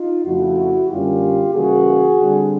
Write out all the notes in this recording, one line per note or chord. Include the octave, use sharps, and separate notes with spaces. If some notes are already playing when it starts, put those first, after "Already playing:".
Already playing: D#4 F4
F2 C#3 F3 A3 E4 F#4
F#2 D3 G3 A#3 C#4 F4 G4
C#3 E3 G3 A#3 F#4 G#4
D3 G3 C4